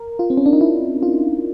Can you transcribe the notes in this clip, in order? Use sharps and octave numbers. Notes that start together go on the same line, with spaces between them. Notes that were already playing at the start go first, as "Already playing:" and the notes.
Already playing: A#4
F4
C4
C#4
D4
D#4
E4
F4